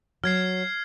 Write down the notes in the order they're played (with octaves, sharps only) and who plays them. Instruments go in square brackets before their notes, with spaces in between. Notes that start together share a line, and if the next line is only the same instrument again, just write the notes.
[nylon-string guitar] F#3 [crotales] F6 G#6 C7